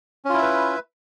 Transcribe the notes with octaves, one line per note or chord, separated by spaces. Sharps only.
C#4 E4 F4 B4 E5